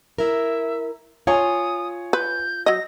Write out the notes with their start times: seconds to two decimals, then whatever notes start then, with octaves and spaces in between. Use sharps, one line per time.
0.18 E4 A#4 E5
1.27 F4 C#5 G#5 D#6
2.13 B4 G6
2.66 F#3 D#5 A#6